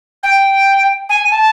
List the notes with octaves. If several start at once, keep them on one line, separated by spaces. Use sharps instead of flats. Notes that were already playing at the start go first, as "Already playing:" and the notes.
G5
G#5
A5